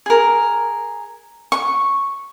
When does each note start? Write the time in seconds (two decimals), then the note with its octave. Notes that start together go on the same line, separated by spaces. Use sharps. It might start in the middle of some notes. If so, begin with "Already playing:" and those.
0.06 G#4 A#4
1.52 C#6